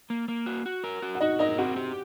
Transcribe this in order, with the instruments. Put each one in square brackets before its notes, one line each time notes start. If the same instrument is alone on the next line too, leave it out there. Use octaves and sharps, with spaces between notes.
[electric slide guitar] A#3
A#3
F#4
F#4
A#4
F#4
[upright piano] F#5
[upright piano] D#4 D#5 [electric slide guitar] F#4
[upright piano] D#4 D#5 [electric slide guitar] A#4
[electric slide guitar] C4 [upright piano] F#4 F#5
[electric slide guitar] G4